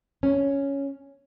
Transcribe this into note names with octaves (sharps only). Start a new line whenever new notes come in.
C#4